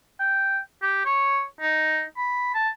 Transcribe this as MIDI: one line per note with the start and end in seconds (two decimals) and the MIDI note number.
0.20 0.58 79
0.82 1.01 67
1.05 1.41 73
1.61 2.03 63
2.17 2.54 83
2.54 2.69 81